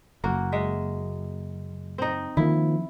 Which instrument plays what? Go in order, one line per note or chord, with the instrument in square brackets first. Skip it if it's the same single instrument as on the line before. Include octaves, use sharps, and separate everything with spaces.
[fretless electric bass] F#1 [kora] A#3 F#4
[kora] G#3 E5
C4 D#4
[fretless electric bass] D#3 F3 A#3 [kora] E4